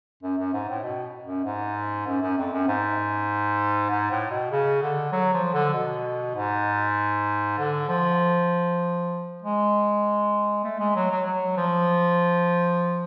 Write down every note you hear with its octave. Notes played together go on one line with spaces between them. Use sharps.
F#2
F#2
G#2
A2
B2
F#2
G#2
F#2
F#2
F2
F#2
G#2
G#2
A2
B2
C#3
D3
F#3
F3
D3
B2
G#2
D3
F3
G#3
A3
G#3
F#3
F#3
F#3
F3